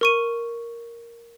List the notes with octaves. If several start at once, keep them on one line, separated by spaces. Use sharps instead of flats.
A#4 C#6 D#7